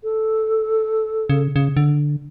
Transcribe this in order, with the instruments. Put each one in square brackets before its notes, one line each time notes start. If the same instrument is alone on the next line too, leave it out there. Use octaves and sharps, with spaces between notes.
[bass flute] A4
[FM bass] C#3
C#3
D3